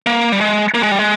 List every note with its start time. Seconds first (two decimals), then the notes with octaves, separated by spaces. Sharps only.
0.06 A#3
0.32 G3
0.41 G#3
0.74 A#3
0.83 G#3
0.91 G3
0.99 G#3